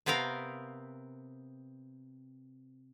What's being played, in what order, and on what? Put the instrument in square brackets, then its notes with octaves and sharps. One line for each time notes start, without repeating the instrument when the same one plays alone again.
[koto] C3 B3 C4 A#4 F5